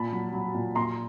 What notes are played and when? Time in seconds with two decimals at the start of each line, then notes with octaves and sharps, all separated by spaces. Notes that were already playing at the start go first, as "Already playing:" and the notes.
Already playing: A#2 A5 B5
0.12 F#3
0.33 F#3
0.54 A#2
0.75 A#2 A#5 C6